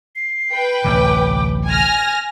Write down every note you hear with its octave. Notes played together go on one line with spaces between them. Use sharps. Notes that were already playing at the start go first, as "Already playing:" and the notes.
C7
B4 G5
A1 D2 C3 D6
G#5 F6 G#6 A#6